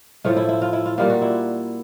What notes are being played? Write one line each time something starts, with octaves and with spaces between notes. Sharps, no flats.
A2 F3 A3 F4
E4
E4
F4
E4
F4
A#2 G3 A#3 F4
F#4
E4